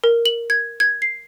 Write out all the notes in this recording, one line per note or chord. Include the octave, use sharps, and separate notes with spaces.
A#4
F#7
G#6
G#6
C7